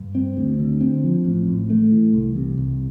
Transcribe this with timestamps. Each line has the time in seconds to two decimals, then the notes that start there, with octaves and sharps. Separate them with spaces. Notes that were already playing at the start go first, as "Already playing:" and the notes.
Already playing: G2
0.15 C4
0.37 D2
0.60 D3
0.81 C4
1.04 F3
1.25 A1
1.47 A2
1.70 A3
1.92 E3
2.13 C2
2.36 C3
2.58 C2